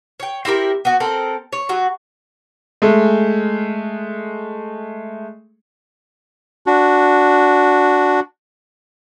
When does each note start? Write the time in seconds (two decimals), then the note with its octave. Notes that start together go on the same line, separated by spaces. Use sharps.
0.20 C#5 G5
0.45 C4 E4 G4 A#4
0.85 B3 F#4
1.00 C4 A4 A#4
1.52 C#5
1.69 F#3 F#4
2.82 G#3 A3
6.66 D4 F#4